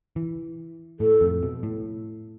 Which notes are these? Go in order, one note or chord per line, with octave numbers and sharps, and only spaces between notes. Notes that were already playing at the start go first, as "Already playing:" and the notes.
E3
A2 A4
F2
B2
A2